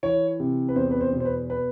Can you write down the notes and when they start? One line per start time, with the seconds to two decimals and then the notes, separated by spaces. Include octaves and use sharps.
0.03 E3 C#5
0.40 C3
0.69 B4
0.76 E2 C5
0.91 B4
1.01 C5
1.13 B2
1.20 C5
1.25 B4
1.50 B4